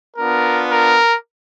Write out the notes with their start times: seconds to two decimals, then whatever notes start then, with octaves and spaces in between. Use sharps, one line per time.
0.17 B3 D4 F4 A#4
0.69 A#4